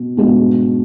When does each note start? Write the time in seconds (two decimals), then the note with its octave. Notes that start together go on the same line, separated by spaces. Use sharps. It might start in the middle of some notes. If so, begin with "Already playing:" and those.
Already playing: B2
0.17 B2 G#3 B3 D4